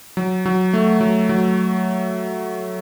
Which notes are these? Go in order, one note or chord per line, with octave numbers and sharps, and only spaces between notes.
F#3
F#3
A3
F#3
F#3